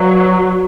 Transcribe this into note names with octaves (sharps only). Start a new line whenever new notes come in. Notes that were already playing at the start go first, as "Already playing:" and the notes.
Already playing: F#3 B4 D5 F5